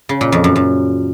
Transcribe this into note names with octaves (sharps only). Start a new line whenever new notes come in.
C#3
A#2
F2
F#2
F#2